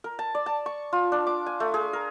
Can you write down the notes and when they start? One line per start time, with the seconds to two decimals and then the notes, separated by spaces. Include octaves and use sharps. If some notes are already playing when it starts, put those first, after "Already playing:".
0.04 A#4
0.19 A5
0.35 D5
0.46 A5
0.66 C#6
0.93 F4
1.12 D4
1.27 D6
1.46 G#5
1.60 A3
1.74 G#4
1.93 A#4